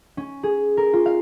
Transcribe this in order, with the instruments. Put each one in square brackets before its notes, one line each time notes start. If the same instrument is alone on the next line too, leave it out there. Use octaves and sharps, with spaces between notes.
[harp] C#4
G#4
A#4
F4
F5